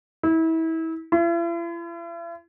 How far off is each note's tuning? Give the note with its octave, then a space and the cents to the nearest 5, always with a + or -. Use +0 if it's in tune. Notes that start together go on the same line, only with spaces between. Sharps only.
E4 -30
E4 +45